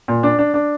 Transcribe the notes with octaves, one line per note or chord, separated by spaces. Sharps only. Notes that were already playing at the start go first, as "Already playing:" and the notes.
A#2
D4
D4
D4